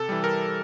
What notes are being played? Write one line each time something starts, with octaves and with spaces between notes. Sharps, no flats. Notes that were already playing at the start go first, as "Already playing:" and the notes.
Already playing: C3 A4
E3 G3
A#4